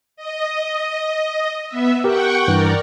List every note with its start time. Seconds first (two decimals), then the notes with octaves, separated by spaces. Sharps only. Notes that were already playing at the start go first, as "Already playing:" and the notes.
0.16 D#5
1.68 B3 E5
2.04 G4 A#4 F#5 G5 C#6
2.48 G2 E3 A#4 D5